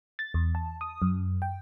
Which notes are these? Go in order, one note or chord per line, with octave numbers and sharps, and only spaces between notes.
A6
E2
A5
D#6
F#2
G5